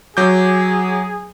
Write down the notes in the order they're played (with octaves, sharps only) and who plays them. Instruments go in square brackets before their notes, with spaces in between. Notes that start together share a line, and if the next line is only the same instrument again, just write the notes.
[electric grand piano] F#3 D6 G6 [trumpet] G#4